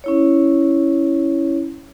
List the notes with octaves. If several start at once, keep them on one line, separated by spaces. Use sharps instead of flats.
C#4 E4 C#5